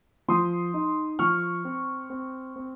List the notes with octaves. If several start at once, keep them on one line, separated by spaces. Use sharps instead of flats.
F3 C6 D#6
D#4
F3 C#6 F6
C4
C4
C4